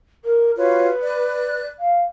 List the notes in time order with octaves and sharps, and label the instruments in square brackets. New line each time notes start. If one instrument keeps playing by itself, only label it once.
[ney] A#4
[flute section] F4 F#4 C#5 [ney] B4
[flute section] D5 F#6
[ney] F5